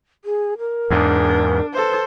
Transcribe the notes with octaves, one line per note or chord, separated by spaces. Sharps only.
G#4
A#4
E2 G#2 D4
A4 B4 C5